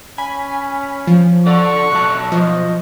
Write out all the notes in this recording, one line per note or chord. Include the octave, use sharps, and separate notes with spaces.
C#4 G#5 B5
F3
A4 D5 F#5 C#6
B2 F#3 A5 F#6
F3 D#5